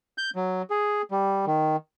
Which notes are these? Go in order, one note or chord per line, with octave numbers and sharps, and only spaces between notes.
G6
F#3
G#4
G3
D#3